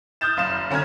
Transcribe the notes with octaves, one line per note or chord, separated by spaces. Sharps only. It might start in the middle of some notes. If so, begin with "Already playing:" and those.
D#6 F6 G6 A6 E7
F#1 F5 E7
D3 C#4 A#5 F6 G#6